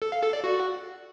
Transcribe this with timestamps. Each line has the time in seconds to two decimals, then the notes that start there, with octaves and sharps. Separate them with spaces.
0.02 A4
0.12 F5
0.23 A4
0.33 D5
0.44 F#4